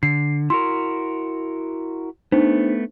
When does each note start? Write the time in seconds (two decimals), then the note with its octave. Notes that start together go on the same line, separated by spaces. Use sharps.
0.03 D3 C7
0.50 E4 F#4 A#4 C6
2.32 A3 B3 D4 D#4 C5